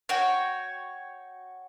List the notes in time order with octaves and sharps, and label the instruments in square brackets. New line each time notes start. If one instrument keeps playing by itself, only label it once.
[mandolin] F#4 C#5 G5